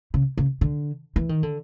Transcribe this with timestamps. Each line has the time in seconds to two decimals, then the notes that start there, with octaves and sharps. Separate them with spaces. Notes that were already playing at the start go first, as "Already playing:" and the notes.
0.14 C#3
0.38 C#3
0.61 D3
1.16 E3
1.29 D#3
1.43 D3